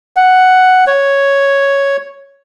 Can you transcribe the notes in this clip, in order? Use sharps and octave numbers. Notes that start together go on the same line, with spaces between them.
F#5
C#5